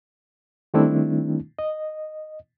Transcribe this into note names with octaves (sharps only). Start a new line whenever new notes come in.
D#3 G3 A3 C4 D4 E4
D#5